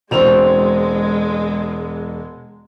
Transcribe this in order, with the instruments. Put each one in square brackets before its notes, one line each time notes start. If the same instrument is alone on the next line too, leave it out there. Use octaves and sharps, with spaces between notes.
[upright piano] E1 F7 [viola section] G#3 [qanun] C4 F#4 G5